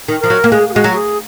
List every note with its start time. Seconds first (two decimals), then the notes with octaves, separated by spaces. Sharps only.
0.08 D#3
0.20 F3 A#4
0.30 F#3
0.44 A#3
0.52 G#3 G#4
0.69 G#4
0.73 G#3 F#4
0.84 F#3
0.95 G#4